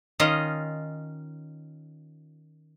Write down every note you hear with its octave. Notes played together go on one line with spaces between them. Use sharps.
D#3 C#4 F4 D#5